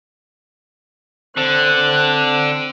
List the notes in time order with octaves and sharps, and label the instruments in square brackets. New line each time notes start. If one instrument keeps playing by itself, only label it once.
[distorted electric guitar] D3 [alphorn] C4 [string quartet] F#6